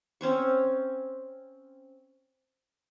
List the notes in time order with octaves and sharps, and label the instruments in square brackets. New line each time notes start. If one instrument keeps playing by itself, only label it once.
[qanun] C4 C#4 C5 C#6